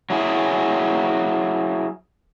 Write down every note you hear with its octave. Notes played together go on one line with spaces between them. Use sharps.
F#3 E4 G#4